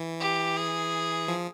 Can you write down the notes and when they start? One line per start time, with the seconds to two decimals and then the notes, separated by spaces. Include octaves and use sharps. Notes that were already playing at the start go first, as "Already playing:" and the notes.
Already playing: E3
0.20 G4
0.56 G#4
1.28 F3